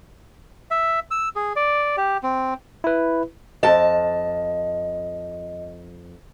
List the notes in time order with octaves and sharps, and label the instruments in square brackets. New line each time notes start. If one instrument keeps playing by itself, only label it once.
[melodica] E5
E6
G#4
D5
G4
C4
[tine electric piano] E4 B4
[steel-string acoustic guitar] F2 A5 [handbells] D#5